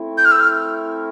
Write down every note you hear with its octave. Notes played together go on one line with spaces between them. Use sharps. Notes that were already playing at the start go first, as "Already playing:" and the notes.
Already playing: A3 C4 E4
G6
F6
E6
F6